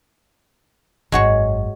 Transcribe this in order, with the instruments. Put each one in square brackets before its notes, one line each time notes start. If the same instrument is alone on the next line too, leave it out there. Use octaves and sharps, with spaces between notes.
[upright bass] G#1 F#2 [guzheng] G#3 F#4 C#5